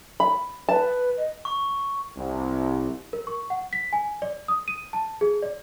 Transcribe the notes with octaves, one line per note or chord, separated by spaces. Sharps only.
B5
B4 A5
D#5
C#6
C2
A#4
C#6
F#5
B6
G#5
D5
D#6
D#7
A5
G#4
D5